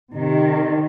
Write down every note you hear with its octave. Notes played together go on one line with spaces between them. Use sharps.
C3 D#3